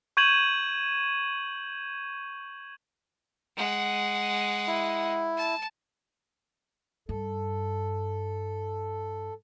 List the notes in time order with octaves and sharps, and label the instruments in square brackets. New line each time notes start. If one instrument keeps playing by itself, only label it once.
[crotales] C#6 G6 G#6 D#7 E7 F#7
[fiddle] G#3 F#5
[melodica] E4
[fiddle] A5
[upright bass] G2 [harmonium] A4